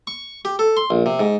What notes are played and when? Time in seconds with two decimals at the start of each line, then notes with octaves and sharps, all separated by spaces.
0.07 C#6
0.45 G4
0.59 A4
0.77 C6
0.90 A#1
1.06 C3
1.20 G#2